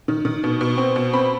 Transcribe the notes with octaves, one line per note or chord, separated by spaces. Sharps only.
D#3
D#3
B2
B2
C4
B2
C4 B5